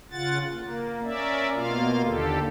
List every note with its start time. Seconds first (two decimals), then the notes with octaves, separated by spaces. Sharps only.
0.11 C#3 F4 F#5 A6
0.52 A#3
1.03 C#4 A#4 D5 E5
1.53 B2 A#3 F4 F5
2.03 D#2 D3 G4 A4